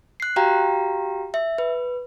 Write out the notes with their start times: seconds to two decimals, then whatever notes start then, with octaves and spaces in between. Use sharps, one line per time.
0.20 F#6 C7
0.36 F#4 G4 F5 G5 A#5
1.34 E5
1.58 B4